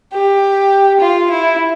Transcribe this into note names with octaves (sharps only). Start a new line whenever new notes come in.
G4
F4
E4